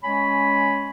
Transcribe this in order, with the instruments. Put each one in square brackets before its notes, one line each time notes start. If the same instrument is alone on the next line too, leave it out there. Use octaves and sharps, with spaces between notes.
[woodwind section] G#3 C#4 C#5 G#5 B5